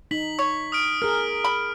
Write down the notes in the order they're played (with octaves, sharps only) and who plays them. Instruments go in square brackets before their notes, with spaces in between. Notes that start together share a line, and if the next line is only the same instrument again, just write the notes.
[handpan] D#4 [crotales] B6 F#7
[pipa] C#5
[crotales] D#6 F6 D7
[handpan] G#4 A#4 [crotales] D#6 F6
[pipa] B5